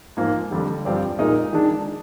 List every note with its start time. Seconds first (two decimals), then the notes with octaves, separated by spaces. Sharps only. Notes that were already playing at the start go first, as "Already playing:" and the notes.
0.17 G#2 F3 A#3
0.51 F2 D3 G3
0.85 G2 F3 C4 G4 D5
1.19 A#2 G#3 D#4 A#4 D#5
1.53 D#3 G#3 D4